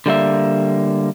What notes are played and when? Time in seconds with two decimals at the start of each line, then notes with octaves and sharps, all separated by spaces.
0.06 D3 G3 A#3 E5